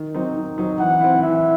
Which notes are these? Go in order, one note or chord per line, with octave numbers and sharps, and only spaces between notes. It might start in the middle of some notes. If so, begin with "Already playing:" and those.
Already playing: D#3
F#3 C4 D#4
D#3
F#3 C4 D#4
E3 F#5
C4 E4
E3 E5